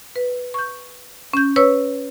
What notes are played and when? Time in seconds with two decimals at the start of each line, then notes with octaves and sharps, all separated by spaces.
0.16 B4
0.54 C#6 G6
1.33 C#4 G6
1.56 B4 C#5 C#6 E6